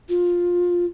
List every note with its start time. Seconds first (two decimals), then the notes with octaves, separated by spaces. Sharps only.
0.09 F4